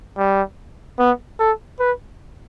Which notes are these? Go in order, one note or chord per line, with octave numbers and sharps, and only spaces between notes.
G3
B3
A4
B4